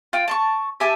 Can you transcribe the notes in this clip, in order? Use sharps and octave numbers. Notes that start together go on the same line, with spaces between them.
F4 G5
A5 C6 C#6
G4 E5 G#5 A5